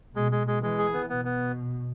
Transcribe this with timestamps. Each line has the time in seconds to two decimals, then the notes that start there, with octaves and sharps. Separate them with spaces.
0.16 B2 G#3
0.32 G#3
0.47 G#3
0.63 E3 G#3
0.78 G#4
0.94 B3
1.10 B2 B3
1.25 B3